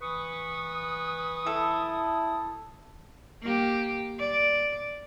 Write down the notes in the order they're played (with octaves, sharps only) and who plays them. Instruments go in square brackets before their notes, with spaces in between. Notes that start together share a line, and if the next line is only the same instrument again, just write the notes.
[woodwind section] E3 B4 C#6 [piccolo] D#6
[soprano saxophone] E4 [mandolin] A4
[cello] A#3 G4
D5